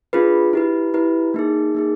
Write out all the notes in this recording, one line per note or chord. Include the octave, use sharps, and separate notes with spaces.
D4 F4 G#4 B4
E4 G4 B4
E4 G4 B4
A#3 D#4 G#4
A#3 D#4 G#4